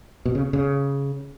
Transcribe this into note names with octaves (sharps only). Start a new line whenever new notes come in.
B2
C#3
C#3